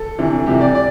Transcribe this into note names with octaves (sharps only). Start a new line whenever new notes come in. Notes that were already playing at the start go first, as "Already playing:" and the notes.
Already playing: A4
D2 C3 E3
C2 C3 E3 G4
D5
D5